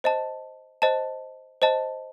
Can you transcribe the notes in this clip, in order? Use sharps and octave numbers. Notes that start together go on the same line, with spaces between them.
C5 D#5 A5
C5 D#5 A5
C5 D#5 A5